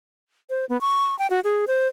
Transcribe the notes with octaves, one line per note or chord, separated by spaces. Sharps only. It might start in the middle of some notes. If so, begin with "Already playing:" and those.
C5
B3
C#6
G5
F#4
G#4
C5